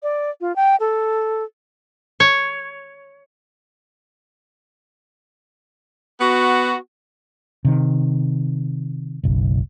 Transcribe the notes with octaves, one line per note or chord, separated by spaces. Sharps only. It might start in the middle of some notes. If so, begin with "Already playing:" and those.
D5
F4
G5
A4
C#5
B3 F#4
C3 D#3
F#1 B1